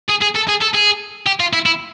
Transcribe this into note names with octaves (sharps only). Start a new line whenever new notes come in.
G#4
G#4
A4
G#4
A4
G#4
G4
F4
E4
E4